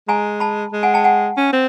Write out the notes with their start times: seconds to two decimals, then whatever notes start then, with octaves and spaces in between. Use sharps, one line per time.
0.08 G#3 G#5 A#5
0.40 A5 B5
0.72 G#3
0.83 F#5 G#5
0.94 G5 A5
1.04 F#5 G#5
1.37 C#4
1.53 C4